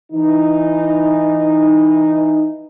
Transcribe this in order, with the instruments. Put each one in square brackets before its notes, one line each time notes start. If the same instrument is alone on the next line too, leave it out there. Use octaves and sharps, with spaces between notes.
[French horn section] E3 D#4